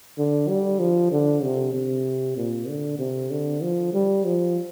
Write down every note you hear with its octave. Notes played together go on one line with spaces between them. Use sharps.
D3
G3
F3
D3
C3
C3
A#2
D3
C3
D3
F3
G3
F3